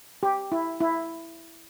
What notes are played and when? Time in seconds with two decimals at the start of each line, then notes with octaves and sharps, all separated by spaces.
0.23 G4
0.52 E4
0.80 E4